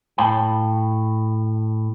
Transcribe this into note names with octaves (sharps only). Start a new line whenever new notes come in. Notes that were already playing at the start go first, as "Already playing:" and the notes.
A2 C#5 F5 G5 A5 B5